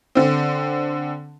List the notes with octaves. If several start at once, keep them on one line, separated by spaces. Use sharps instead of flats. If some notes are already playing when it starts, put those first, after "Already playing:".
D3 C4